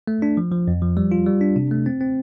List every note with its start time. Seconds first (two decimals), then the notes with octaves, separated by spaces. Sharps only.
0.07 A3
0.22 D4
0.37 F3
0.52 F3
0.68 F2
0.82 F3
0.97 G3
1.12 F4
1.26 G3
1.41 D4
1.56 C3
1.71 A3
1.86 C4
2.01 C4